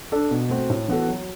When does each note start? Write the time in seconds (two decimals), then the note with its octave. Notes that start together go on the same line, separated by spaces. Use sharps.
0.12 D4 A4
0.31 B2
0.50 A3 C4 F#4
0.70 A2
0.88 E3 B3 F#4 A4
1.08 F#3